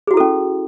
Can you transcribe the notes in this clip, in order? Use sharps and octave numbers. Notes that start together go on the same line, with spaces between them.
C#4 E4 F#4 G#4 A4